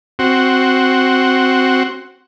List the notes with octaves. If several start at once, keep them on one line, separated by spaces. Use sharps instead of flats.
C4 F#4